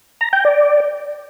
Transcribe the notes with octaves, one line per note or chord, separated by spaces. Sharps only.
A#5
G5
D5